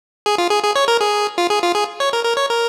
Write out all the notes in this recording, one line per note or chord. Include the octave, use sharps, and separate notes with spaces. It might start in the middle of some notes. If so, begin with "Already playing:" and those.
G#4
F4
G#4
G#4
C#5
A#4
G#4
F4
G#4
F4
G#4
C#5
A#4
A#4
C#5
A#4